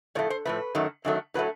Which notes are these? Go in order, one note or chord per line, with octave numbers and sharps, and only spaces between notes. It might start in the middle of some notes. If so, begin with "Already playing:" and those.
A2 F3 A3 C#5
C5
A2 F3 A3 B4
F#2 D#3 F#3 A3
F#2 D#3 F#3 A3
A2 F#3 A3 B4